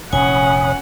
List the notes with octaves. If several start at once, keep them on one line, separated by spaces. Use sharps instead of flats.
F1 A#2 C#4 C#5 F#5 G#5 B5 D#6